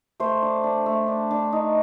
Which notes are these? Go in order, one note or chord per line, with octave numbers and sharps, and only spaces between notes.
A3 C5
D4
D4
A3
D4
D4
D#4